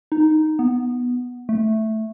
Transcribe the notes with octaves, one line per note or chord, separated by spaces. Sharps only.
D#4
B3
A3